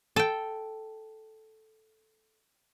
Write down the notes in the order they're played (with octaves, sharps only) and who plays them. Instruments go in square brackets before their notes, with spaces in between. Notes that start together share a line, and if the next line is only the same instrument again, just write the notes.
[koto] A4 G5